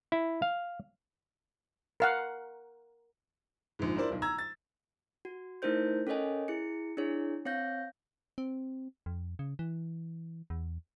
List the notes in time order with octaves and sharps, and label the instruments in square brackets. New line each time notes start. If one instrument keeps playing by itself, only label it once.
[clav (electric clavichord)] E4
F5
[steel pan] A#4 F5 F#5
[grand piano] A#1 G#2
D4 E4 A#4 C5 D5
D1 B1
A#5 E6 G#6
A6
[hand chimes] F#4
A3 D#4 E4 A#4 C5 G6
C#4 A4 A#4 C#5 D#5 G#5
E4 G#4 C#7
D4 E4 G#4 C#5
C4 C#5 F5 G6 A#6
[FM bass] C4
F2
C#3
E3
E2